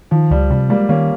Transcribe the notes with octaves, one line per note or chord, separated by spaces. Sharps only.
D#3 F3
C#2 G3
C3 G3
G3 G#3 A#3
D#3 A#3 C#4